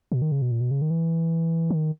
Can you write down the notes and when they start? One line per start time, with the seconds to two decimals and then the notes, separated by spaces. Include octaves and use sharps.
0.12 B2
0.22 D#3
0.32 C#3
0.42 B2
0.51 A#2
0.61 B2
0.71 C#3
0.82 D#3
0.90 E3
1.70 D#3